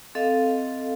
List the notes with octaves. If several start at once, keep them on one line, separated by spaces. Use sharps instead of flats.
C4 A4 D#5 F5